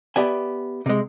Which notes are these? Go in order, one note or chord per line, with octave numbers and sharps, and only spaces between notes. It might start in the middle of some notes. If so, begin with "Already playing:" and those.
B3 G4 D5 E5 G#5
C3 G#3